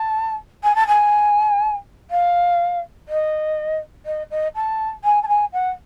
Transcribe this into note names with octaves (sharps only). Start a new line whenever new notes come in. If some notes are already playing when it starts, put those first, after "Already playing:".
Already playing: A5
G#5
A5
G#5
F5
D#5
D#5
D#5
A5
G#5
A5
G#5
F#5